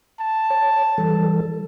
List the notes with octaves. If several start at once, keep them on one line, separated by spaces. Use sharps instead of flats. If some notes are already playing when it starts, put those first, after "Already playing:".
A5
C#5
E3 G3 A4